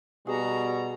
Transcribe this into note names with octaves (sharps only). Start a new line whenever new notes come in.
B2 G3 F#4 G#4 A#5